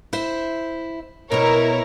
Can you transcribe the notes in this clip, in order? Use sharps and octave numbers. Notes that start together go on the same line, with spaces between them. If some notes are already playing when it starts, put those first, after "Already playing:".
E4 C5 E5
B2 E4 A#4 C#5 A#5